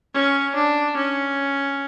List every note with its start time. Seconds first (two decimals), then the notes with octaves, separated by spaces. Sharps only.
0.14 C#4
0.55 D4
0.96 C#4